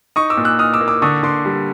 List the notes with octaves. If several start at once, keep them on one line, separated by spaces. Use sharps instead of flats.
D#4 C#6 D#6
D6 E6
A#2
E6 F#6
D#4 D#6 F6
D6 E6
A#3
D6 E6
D3 C#6 D#6
D3 C6 D6
G3